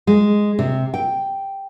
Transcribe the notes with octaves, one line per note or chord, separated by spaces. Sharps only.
G#3
C3
G5